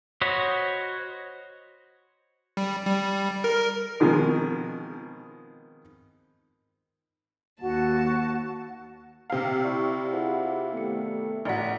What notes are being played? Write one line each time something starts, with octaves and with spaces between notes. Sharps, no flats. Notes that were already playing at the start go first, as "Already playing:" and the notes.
F#4 C5 C#5 D#5 B5
G3
G3
A#4
B2 D#3 F3 G#3 C4
D#2 F#4 F#5 A5
C3 F5
E4 D5 C#6
E4 F4 G#4 C5 F#5
D#3 G3 A3 B3 C#7
A1 F#4 D5 A#5 B6